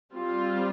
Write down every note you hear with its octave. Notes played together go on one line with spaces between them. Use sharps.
G3 C4 F4